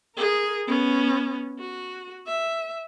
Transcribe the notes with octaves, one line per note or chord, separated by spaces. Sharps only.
G#4 A#4
B3 C#4
F#4
E5